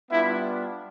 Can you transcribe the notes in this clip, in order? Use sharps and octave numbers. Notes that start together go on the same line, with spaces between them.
G3 B3 D4 E4 F4 E5